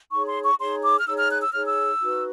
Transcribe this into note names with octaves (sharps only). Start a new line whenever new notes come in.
D#4 G#4 C#5 C#6
C6
C#6
D#4 G#4 C#5 C6
D6
F6
D#4 G#4 C#5 E6
F6
F#6
E6
D#4 G#4 C#5 F6
E6
D#4 F#4 B4